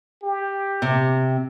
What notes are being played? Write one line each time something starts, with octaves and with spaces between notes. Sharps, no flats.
G4
C3